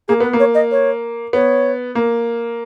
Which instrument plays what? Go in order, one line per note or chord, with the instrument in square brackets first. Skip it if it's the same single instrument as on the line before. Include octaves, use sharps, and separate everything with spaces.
[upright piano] A#3 [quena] G#4
[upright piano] B3 [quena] B4
[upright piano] A#3
[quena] C#5
D#5
C#5
[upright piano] B3 [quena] C#5
[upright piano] A#3